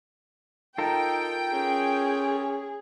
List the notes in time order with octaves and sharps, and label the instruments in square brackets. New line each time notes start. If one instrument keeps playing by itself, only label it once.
[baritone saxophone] D#4 [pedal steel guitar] F4 A4 A#4 [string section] G5
[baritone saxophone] C#4 [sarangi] G#4